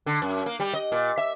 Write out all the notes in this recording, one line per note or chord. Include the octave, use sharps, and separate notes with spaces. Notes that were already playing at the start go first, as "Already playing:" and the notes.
D3
F#2
A#3
G3
D#5
A#2
E5